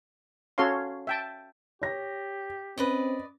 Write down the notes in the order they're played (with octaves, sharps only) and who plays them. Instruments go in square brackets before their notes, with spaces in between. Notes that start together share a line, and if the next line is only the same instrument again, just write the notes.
[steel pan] C#4 F#4 A4 C#5 F5 C6
E5 G5 A5
[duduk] G4 [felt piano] C#5 A#6
[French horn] C4 [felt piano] C#4 [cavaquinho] B4 D5 D#5